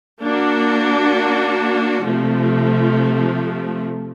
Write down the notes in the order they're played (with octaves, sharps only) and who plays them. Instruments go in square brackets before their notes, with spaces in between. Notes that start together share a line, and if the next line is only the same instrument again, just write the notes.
[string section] A#3 D4 F#4
C3 F3 A3